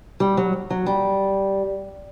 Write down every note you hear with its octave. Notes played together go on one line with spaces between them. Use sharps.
G3
F#3
F#3
G3